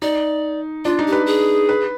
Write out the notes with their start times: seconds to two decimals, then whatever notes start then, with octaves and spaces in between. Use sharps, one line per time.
0.02 D#4 D5
0.85 D4 F4
0.99 D#4
1.07 G4
1.12 B4
1.26 G#4
1.69 B4